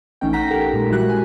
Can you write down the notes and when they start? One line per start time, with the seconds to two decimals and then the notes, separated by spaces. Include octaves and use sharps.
0.21 A#1 E3 A3 C#4 D#4 G5
0.33 F#5 G5 A#5 A#6 B6
0.50 G4 A4 A#4 F#5
0.73 A#2 G#3
0.90 E3 G3 E4 F#4 F#6
1.10 G#5